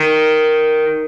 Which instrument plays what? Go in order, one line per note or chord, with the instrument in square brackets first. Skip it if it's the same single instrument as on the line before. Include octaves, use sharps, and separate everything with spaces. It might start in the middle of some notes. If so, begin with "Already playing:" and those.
Already playing: [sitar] D#3